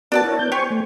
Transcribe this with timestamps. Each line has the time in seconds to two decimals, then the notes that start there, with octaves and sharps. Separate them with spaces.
0.12 B3 D4 F#4 A#4 D5 A5
0.24 E4 A#4 C#5
0.39 B3 G6
0.52 G4 C5 G#5 C#6
0.70 A3